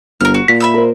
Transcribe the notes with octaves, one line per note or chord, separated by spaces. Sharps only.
G1 A#4 F6
F#4
A#2 B6
E5 B5 E6
A#4 C5